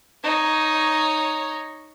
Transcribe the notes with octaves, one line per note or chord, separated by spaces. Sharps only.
D#4 C#5